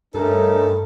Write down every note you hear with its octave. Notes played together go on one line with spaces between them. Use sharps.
G2 A3 C#4 D#4 A4 A#4